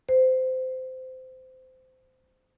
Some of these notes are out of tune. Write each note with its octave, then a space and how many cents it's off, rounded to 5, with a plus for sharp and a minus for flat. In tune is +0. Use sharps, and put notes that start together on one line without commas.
C5 -20